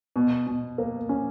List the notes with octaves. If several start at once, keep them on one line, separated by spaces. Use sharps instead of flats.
B2
B2
A#3
C#4